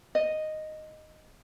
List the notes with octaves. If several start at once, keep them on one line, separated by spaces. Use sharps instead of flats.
D#5